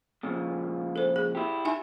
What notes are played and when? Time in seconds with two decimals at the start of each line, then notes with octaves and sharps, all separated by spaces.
0.23 A#2 C#3 F3
0.96 A4 C5
1.16 G#4
1.35 E4 G4
1.65 D#4 E5 G#5